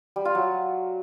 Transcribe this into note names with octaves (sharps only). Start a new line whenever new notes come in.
G3
F4
F#3